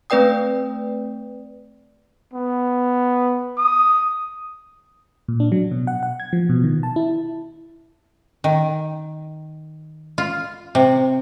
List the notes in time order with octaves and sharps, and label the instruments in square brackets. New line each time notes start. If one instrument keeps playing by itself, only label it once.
[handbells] A3 C4 B4 D5 G5 D#6
[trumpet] B3
D#6
[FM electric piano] A#2
D4
F#3
B2
F#5
F#5
G#6
F3
B2
D#3
A5
E4
[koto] D#3
F4
C3